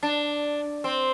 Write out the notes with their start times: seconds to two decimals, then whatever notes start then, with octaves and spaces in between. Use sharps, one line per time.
0.03 D4
0.84 C4